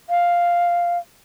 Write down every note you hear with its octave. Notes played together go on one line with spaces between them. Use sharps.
F5